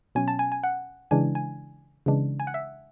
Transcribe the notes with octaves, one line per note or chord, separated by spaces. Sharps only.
B2 F#3 C#4 G#5
A5
G#5
G#5
F#5
C#3 E3 G#3 D4 G#5
G#5
C#3 E3 G#3 D4
G#5
F#5
E5